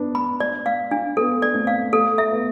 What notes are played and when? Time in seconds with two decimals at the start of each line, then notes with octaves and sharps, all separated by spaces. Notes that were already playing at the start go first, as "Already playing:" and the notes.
Already playing: B3 D4
0.15 B5
0.40 D5
0.66 F5
0.91 D4
1.17 B3 A4
1.42 D5
1.54 A3 C4
1.67 F5
1.93 A3 A4
2.18 E5
2.31 B3